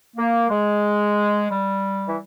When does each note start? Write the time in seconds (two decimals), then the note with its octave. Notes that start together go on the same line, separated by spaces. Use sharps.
0.16 A#3
0.49 G#3
1.49 G3
2.06 E3